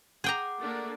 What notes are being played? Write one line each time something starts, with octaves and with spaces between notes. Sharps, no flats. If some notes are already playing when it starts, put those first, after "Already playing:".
G#4 F#5 G5 A#5 D6
A3 A#3 D4